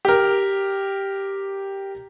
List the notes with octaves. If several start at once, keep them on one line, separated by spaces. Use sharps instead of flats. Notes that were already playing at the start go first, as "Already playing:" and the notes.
G4 A#4